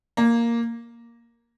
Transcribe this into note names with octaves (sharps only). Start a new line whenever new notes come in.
A#3